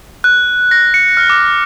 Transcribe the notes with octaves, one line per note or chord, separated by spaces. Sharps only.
F#6
A#6
C#7
F6
D6